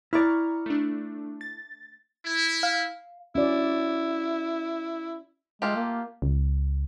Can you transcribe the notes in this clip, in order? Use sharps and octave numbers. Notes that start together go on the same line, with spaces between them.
E4 D5 A#5 C#6 F6
A3 D4
A6
E4
F5
C#4 E4 F#4 D5
G#3 A3 F4 G4
A#3
C#2